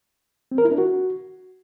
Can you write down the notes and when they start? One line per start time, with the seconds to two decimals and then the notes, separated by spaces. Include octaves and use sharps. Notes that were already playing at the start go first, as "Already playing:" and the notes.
0.51 C4
0.58 A#4
0.65 E4
0.72 D4
0.78 F#4